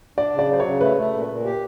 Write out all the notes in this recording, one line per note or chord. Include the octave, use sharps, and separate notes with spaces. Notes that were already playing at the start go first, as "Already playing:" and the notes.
D4 D5
C#3
D5
F#3 C5
C#5
C#3
A3 B4
A3
A#2
A#2
G4